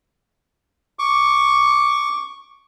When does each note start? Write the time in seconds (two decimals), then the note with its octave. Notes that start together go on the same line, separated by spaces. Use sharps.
0.99 C#6 D6